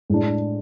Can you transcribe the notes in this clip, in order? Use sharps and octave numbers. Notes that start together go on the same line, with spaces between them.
A2 G#3 D4